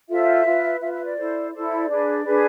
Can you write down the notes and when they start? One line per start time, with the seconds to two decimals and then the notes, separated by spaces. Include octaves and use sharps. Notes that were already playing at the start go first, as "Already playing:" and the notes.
0.09 F4 A4 C5 E5
0.45 F4 B4
0.81 F4 E5
0.85 B4
0.93 E5
1.05 D5
1.17 E4 A4 C5
1.52 E4 A4 C5 D5
1.88 D4 G#4 B4
2.24 D4 G#4 B4